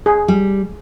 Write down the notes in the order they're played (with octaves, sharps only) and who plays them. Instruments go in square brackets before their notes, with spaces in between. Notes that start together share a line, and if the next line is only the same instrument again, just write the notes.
[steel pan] G#4
[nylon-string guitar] G3